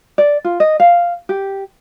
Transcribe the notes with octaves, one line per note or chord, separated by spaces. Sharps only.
D5
F4
D#5
F5
G4